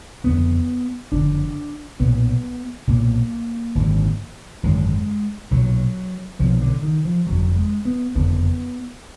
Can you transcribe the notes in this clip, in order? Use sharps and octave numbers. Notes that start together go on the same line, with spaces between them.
F#1 F2 D3 B3
F#1 F2 D3 D4
B1 A#2 B3
B1 A#2 A#3
G#1 F#2 D3
G#1 F#2 D3 G#3
B1 A#2 F#3
B1 A#2 F3
D3
D#3
F3
F#1 F2 D3 F#3
G#3
B3
F#1 F2 D3 B3